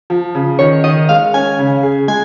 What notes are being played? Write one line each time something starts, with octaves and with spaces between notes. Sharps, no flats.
F3
C#3
D#3 C#5
D#3 D#5
G#3 F5
C#4 G#5
C#3
G#4
G#3 G#5